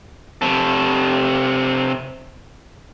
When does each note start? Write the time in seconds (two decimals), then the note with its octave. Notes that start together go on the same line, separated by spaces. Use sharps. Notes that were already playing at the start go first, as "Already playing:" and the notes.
0.42 C3 A4